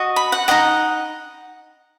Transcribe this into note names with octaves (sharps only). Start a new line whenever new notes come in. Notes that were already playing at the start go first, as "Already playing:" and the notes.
Already playing: F#4 D#5
B5
F#5
D#4 F#4 D#5 F#5